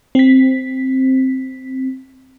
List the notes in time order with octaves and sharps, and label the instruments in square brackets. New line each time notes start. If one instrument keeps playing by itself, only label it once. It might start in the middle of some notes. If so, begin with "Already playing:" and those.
[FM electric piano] C4 B6